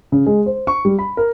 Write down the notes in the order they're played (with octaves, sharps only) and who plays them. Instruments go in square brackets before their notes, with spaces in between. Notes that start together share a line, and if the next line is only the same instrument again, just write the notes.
[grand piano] C#3
G#3
C5
C#6
G3
B5
A#4